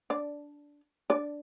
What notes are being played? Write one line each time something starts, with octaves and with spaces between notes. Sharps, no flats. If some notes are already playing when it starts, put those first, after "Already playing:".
D4 D5
D4 D5